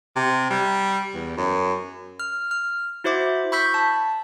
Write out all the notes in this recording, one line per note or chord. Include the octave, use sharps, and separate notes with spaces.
C3
G3
E2
F#2
F6
F6
E4 F#4 C5 E5 D6
B5 C#6 E6 G6 B6
A5